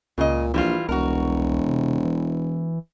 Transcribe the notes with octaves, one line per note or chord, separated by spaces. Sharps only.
C#2 A#2 C#3 D#5
A#1 E3 G3 F4
E1 C2 F#4 A#4
C3
E3